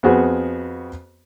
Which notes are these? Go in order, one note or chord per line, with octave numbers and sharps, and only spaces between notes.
F2 B3 C4 F#4 G#4